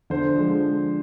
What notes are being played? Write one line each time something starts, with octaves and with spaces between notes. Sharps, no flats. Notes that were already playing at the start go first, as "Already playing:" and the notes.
D3 C5
F3 G#3